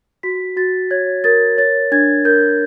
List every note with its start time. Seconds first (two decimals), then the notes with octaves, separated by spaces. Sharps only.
0.23 F#4 B6
0.57 F#4 A6
0.91 C#5 G#6
1.24 A#4 A6
1.58 C#5 A6
1.92 D4 G#6
2.25 A#4 G6